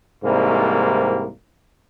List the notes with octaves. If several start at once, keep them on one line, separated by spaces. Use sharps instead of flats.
C2 G#2 C3 E3 G3 A#3